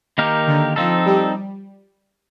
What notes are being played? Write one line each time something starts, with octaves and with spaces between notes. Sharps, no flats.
D#3 A#3 D#4 G4 A#4
D3
F3 C4 D#4 A4
G3